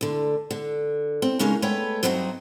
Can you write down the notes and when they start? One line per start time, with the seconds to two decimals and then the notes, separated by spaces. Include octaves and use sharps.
0.01 D2 D3
0.51 D3
1.22 C4
1.39 C#3 G#3 C#4 D#4 A#4
1.62 G#3 A3 B3 B4 C#5 G5
2.03 G2 F#3 C4 D#4 F#4 D#5